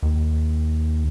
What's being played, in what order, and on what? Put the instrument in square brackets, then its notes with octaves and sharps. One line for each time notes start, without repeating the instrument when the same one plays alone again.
[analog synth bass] D#2